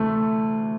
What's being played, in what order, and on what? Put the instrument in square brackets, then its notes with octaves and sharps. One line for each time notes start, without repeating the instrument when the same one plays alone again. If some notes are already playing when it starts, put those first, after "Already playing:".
Already playing: [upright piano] D2 C3 E3 [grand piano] A3